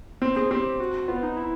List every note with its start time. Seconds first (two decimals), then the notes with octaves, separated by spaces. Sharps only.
0.22 C4
0.36 C4 G#4
0.50 C4 G4
0.80 F#4
1.08 B3 F4
1.23 D#4
1.37 E4